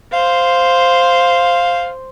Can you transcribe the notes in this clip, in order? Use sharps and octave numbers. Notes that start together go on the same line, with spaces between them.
C5 F5